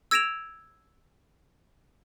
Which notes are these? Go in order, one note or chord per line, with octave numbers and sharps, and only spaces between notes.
E6 G#6 A#6 D7 E7 F7